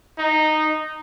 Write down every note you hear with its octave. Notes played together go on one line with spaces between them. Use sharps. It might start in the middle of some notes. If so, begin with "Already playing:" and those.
D#4